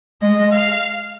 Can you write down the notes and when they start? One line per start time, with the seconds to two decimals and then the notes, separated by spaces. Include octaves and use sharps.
0.22 G#3 D#5
0.52 F5